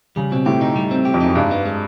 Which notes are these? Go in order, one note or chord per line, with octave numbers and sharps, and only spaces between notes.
C#3 G3
B2 C4
A2 G4
D#4
G3
C4
G4
F2
F#2 D#4
G2 G#3
B3
G#3